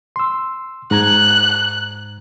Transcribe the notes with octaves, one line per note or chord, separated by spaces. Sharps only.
C6 E6
G#2 A#5 F#6 G#6